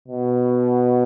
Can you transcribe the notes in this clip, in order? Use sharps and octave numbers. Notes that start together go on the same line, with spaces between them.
B2